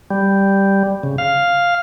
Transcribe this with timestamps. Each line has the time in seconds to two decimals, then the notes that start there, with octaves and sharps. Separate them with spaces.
0.11 G3
1.03 C#3
1.18 F5